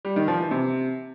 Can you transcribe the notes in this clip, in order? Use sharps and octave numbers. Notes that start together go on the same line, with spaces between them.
G3
D#3
F3
E3
C3